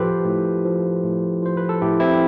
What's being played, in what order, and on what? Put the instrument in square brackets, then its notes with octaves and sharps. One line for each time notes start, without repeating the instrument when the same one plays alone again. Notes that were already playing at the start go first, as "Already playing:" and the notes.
Already playing: [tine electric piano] A2 F3 F4 G4 A4 B4 C5
A2
F3
A2
F3 C5
B4
A4
A2 E4 G4
C4 E4